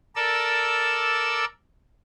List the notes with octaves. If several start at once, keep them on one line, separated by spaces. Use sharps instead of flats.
A4 A#4 D5 E6